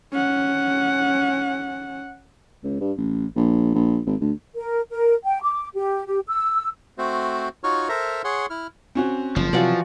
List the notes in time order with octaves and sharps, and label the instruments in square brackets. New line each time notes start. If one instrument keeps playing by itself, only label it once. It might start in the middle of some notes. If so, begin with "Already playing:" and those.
[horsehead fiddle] C#4 F#5
[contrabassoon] C#2
G2
A1
A#1
A#1
G#1
D2
[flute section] A#4
A#4
G5
D6
G4
G4
E6
[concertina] A3 C4 F#4 C5
D#4 F4 F#4 C#5 C#6 F6
A4 A#4 C5 E5 A#5
G#4 C#5 F#5 C6
E4 F6
[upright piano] C4 C#4 F#4
[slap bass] F#1 [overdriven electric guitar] F3
[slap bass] C3 F#3 [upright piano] E3 [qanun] F4 F#4 D5